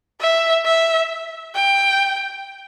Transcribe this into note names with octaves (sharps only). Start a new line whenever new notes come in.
E5
E5
G5